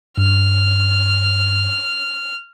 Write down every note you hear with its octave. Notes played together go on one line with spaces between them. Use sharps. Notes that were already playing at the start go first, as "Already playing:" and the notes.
G2 F6